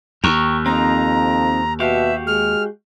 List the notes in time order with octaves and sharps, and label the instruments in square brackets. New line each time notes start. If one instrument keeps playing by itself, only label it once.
[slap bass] D#2 [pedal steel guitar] G5 A#5 C#6
[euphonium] F2 [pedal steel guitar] C4 D#4 [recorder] A#5
[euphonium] B2 [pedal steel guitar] F#4 G4 F5 [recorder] E5
[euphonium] G#3 [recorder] F6